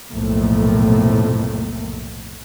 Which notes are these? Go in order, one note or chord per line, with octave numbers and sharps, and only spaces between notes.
B1 F2 A2 C3 A3 A#3